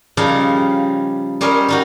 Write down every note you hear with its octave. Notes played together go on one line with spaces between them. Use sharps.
C#3 F3 G3 D#4 F5
G3 C#4 A#4 C5 D#5
G3 D#4 F#4